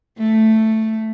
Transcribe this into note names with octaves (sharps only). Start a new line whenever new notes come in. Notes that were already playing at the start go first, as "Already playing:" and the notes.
A3